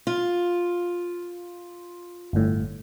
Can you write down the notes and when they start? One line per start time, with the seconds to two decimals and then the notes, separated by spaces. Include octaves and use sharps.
0.07 F4
2.33 G1 A2